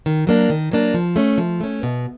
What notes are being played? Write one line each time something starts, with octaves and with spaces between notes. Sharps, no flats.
D#3
F#3 A#3 D4
D#3
F#3 A#3 D4
F3
A3 C#4
F3
A3 C#4
B2